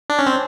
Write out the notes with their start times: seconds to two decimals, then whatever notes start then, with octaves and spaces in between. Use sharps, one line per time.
0.10 D4
0.19 C#4
0.27 C4